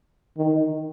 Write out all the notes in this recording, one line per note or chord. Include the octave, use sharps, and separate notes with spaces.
D#3